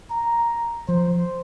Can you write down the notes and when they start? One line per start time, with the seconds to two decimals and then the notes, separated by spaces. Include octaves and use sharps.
0.10 A#5
0.88 F3 C5